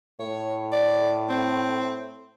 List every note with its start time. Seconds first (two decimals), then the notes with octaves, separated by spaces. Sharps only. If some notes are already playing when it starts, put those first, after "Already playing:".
0.20 A2 C#5
0.73 D5
1.29 C4